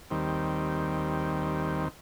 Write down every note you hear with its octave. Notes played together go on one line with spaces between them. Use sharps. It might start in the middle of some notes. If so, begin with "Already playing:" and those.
D#2 D#3 G3 C4